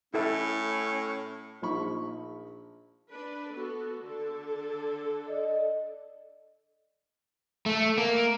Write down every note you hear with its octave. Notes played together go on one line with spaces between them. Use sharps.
A2 C#4 E4 A4 E5
A#1 F3 D#4 B5 C#6
D4 B4
B3 F#4 A4
D3 A4
D5 D#5
A3
A#3